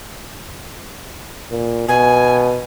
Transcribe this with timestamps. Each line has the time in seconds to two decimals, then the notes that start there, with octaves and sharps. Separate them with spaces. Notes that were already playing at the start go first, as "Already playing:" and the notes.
1.51 A#2
1.88 B2 G#5